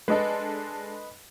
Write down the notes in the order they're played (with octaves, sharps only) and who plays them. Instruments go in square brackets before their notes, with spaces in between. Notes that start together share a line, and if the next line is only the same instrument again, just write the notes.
[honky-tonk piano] G#3 D4 A4 [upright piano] B4 D#5